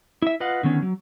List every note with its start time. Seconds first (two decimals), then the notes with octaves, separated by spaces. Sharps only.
0.22 E4 E5
0.40 F4 B4 D#5 F5 F#5
0.63 D3 D#3 B3 C#4
0.82 F#3